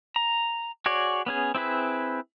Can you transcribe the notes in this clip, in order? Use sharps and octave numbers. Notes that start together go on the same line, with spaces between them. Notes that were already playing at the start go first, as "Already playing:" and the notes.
A#5
F#4 G#4 C#5 D5
B3 C#4 G#4
C4 E4 G#4 B4